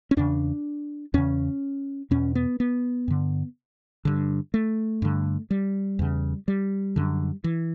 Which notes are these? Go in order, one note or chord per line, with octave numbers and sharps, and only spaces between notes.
C#4
E2 C#3 D4
E2 C#3 C#4
E2 B2 C#4
B3
B3
G2 D3
G2 D3
A3
G2 D3
G3
E2 C#3
G3
F#2 D3
E3